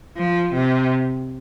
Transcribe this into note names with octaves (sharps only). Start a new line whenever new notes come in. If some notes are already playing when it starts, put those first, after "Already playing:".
F3
C3